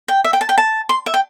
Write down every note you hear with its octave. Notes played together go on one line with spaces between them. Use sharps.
G5
E5
G5
A5
G5
A5
C6
E5
G5